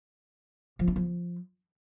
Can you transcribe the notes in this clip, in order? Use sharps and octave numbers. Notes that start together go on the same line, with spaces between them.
F3
D4
F3